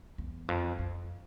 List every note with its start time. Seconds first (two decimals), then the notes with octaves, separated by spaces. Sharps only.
0.18 E2
0.48 F2
0.79 F2